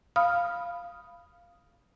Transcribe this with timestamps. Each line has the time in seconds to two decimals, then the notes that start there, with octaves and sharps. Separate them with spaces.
0.16 F5 B5 D#6 F6